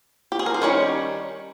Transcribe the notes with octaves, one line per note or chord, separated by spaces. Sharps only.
G4
G#4
A#4
C5
D#3 G3 C#4 A#4 C#5